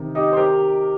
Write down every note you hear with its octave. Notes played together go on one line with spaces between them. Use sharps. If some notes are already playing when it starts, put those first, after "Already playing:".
Already playing: C3 D#3
D#4 G4
C5
G4 A#4